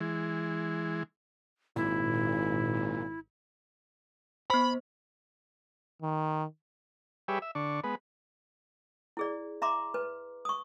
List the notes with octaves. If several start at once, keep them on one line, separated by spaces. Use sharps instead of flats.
E3 G#3
G#1 A#2 E4
B3 C5 B5
D#3
G3 G4 G#4 B4 C#5 E5
E5
D3 D4 C#6
G#3 B3 B4
E4 G#4 D5
E5 A#5 C6 D6
B4
C#6 D#6